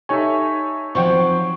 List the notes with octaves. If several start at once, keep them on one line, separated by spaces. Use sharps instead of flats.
D#4 G4 A4 C#5 E5 G#5 C#6
F3 F#3 C4 C5 F#5 G5 C#6